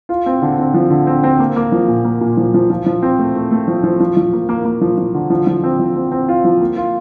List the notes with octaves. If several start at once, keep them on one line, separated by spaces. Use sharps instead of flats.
F4
C4
D3
C4
F3
D3
C4
C4
A#3
A#3
F3
A#2
A#3
A#2
F3
F3
F3
F3
C4
A3
A3
A3
F3
F3
F3
F3
A#3
A#3
A#3
F3
F3
D3
F3
F3
C4
F3
C4
C4
F4
F3
A#3
F4